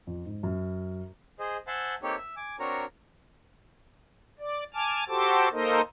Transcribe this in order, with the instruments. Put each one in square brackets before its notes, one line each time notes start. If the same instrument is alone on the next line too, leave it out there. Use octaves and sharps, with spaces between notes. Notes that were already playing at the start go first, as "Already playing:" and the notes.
[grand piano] F2
G#2
F#2
[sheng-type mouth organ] G#4 C5 D#5
C5 E5 F#5 G#5 A5 C6
A#3 C4 D#4 G4 A4 C#5
E5
G#5 D6
C4 D4 F#4 A#4 C#5 A#5
[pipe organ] D5
G#5 A5 D6 F6
F#4 G4 A4 C5 A5 D6
A#3 D#4 A4 A#4 C5 D#5